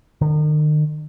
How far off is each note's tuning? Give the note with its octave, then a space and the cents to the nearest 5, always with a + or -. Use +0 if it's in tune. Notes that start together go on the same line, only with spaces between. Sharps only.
D#3 -45